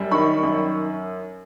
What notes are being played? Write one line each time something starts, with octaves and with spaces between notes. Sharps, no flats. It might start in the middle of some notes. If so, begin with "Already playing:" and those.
Already playing: F#2 G3
D#3 B5 C#6
F#2